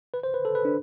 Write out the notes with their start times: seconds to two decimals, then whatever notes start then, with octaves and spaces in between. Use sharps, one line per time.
0.14 B4
0.23 C5
0.34 B4
0.45 A4
0.55 B4
0.65 D4